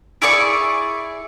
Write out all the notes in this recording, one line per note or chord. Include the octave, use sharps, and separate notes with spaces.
E4 G#4 D5 C#6